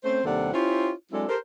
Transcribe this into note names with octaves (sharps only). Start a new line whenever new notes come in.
A3 C4 C#4 C5
D#2 C3 G3 D4 A4 F#5
C#4 E4 F4 G4 C5 C#5
F#3 G#3 C4 D4 E4 A4
G4 A4 A#4 C5